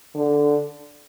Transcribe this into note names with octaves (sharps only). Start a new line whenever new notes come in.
D3